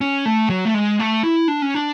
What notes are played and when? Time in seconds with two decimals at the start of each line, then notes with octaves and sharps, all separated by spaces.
0.01 C#4
0.26 A3
0.50 F#3
0.65 A3
0.74 G#3
0.99 A3
1.24 E4
1.48 D4
1.62 C#4
1.75 D4